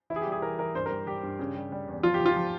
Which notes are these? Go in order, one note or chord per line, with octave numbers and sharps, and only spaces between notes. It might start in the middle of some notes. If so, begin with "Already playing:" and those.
E3 E4
G#4
G4
G3
G#4
E3 A#4
E3 A#4
G2 C5
A#4
G3
G3 G4
G2
C#3
G3
G3
E2
F3 F4
G4
F3
F4
F3